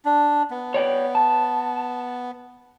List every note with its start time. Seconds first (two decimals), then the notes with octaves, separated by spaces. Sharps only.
0.05 D4
0.51 B3
0.74 C#5 D5 G5
1.15 A5